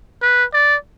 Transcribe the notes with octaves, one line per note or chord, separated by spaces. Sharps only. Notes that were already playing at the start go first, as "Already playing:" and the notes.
B4
D5